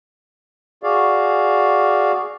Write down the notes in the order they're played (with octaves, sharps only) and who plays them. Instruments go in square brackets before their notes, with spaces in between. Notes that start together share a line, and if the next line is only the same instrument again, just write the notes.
[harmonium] F#4 G#4 D5 F5